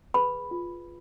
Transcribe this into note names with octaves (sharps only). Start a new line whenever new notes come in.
G#4 B4 B5
F4